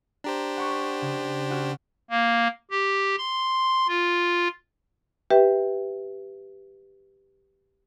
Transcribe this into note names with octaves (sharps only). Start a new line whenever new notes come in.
D4 G4 C5 A#5
F#5 C#6 B6
C#3
F#4 F6
A#3
G4
C6
F4
G4 B4 E5 G5